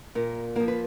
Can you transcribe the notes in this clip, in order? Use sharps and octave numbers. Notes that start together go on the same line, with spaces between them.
A#2 A#4
F3 A#3 A#4
B4